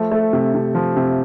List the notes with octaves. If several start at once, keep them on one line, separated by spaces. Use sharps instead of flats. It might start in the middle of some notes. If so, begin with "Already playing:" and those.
Already playing: F3 A3
A3
C3
C3
F3
C3